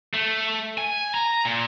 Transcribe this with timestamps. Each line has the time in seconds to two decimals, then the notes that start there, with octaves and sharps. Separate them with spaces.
0.14 A3
0.78 G#5
1.14 A#5
1.45 A#2